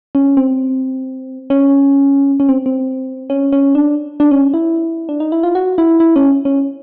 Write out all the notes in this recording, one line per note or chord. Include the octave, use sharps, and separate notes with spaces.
C#4
C4
C#4
C#4
C4
C4
C#4
C#4
D4
D4
C#4
E4
D4
D#4
E4
F4
F#4
E4
E4
C#4
C#4